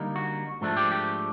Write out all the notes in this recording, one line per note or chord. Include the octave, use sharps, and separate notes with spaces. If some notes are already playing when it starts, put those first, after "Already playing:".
Already playing: D3 G3 A#3 D#4
F#4
G#2 F3 A3 D4
G4
G4